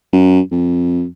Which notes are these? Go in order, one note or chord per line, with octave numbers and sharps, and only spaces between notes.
F#2
F2